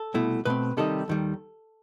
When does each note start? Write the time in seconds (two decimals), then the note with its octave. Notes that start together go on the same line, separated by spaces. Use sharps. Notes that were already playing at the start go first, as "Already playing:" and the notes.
Already playing: A4
0.14 C2 B2 A3 E4
0.45 B2 A3 C4 B4
0.77 C3 D#3 G3 D#4 A4
1.08 D#2 D#3 G3